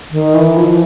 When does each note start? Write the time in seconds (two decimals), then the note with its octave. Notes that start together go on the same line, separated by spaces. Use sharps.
0.11 D#3
0.34 E3
0.57 F3